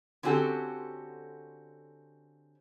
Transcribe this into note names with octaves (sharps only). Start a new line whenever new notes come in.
D3 C4 C#4 F#4 G4 A4